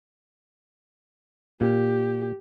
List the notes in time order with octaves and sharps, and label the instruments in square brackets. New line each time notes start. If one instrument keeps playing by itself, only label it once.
[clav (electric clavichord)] A#2 [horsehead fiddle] G4